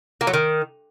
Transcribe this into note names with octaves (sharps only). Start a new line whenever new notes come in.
A#3
F#3
D#3